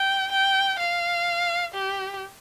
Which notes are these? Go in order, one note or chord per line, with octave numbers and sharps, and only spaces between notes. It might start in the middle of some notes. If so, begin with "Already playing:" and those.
Already playing: G5
G5
F5
G4